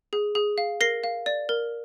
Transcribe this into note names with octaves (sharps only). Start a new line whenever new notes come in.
G#4
G#4
F5
A#4 A#6 C7
F5
D5
A#4